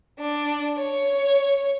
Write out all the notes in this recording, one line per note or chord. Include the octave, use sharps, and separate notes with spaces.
D4
C#5